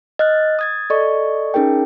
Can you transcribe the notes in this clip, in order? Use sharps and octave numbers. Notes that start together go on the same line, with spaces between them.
D#5 F6 F#6 A6
D#6 G#6 A6
A4 D5 D#5 C#6
C#4 D#4 G#4 A#4 G5